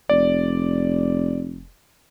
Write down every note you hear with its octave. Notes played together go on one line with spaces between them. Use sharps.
F1 D5